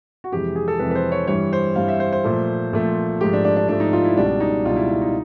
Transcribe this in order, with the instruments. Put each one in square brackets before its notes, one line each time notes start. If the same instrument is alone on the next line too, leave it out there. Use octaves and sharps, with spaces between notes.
[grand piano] F#4
F2 C3 E3 G#3 G4
G#4
A4
F2 C3 E3 G#3 B4
B4
C5
C#5
G2 E3 G3 C#5
C5
G2 E3 G3 F5
E5
C5
C5
A#2 F3 A3
A#2 F3 A3
G#2 F3 A3 G4
D4
D4
D4
G#2 F3 A3 D4
D#4
F4
E4
C#2 B2 G3 D4
D#4
C#2 B2 G3 F4
E4
E4
D#4